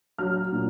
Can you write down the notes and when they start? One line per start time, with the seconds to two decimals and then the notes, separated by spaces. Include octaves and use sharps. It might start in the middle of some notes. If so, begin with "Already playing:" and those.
0.18 F#3 F6
0.52 A#2